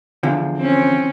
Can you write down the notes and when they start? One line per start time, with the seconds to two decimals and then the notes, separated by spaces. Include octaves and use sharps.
0.23 E2 D3 F3
0.57 C4 C#4